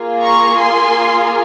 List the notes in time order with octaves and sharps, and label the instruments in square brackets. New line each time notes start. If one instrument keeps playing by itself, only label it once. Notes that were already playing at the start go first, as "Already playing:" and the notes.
Already playing: [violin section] A#3 F4 G#4
A#5 C#6
G#5 C6